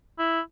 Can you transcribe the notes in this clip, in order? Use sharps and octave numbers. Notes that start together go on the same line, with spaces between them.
E4